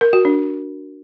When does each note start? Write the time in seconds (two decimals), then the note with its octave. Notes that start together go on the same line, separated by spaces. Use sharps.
0.01 A#4
0.13 F#4
0.25 D4